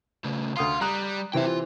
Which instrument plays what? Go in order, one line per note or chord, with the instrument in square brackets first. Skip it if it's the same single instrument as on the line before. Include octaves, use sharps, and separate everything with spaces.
[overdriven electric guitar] C#3 A3
[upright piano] D2 D#6 C7 [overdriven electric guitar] F5 C6
[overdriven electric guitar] G3 [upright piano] A#5 D#6 F#6
[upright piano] C3 E3 C4 [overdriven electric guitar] E5 G5
[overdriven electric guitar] F4